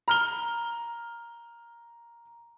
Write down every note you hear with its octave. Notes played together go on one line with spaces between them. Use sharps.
A#5 F6 G7